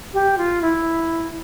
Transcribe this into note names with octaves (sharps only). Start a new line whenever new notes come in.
G4
F4
E4